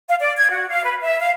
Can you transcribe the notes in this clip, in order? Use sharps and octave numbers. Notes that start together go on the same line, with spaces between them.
F5
D5
G#6
F#4
F5
B4
E5
F5